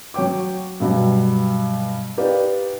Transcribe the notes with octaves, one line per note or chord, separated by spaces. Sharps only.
F#3 C#5 G5 D6
G2 B2 F#3 G3
D#4 G4 B4 D5 F5